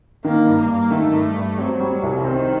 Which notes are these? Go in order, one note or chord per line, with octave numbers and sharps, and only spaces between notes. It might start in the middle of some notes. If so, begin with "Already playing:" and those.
D#3 A#3
G2
A#3
G2
D#3 A3
G2
G2
F#3 C4
G3
C2
D#3 C4